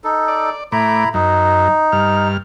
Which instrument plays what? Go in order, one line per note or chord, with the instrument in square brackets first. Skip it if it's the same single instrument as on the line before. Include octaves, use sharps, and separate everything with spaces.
[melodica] D#4 A4
[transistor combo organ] D5
[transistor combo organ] A2 D6 [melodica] E4 A#5 B5
[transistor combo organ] F#2 [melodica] D#4
[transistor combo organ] G2 F6